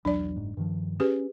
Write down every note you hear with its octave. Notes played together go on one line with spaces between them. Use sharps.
B1 E2 F#3 D4 D5
F#1 G#2
G2 D#3 F3
C#4 G4 G#4 B4